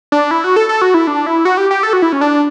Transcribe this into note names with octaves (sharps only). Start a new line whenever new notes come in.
D4
E4
F#4
A4
A4
F#4
E4
D4
E4
F#4
G4
G4
A4
F#4
E4
C#4
D4